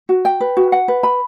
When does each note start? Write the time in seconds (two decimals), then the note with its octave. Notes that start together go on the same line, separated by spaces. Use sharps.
0.09 F#4
0.25 G5
0.40 B4
0.57 F#4
0.72 F#5
0.88 B4
1.03 B5